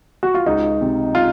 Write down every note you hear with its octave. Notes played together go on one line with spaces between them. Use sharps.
F#4
F4
C#2 D#4
C3
F4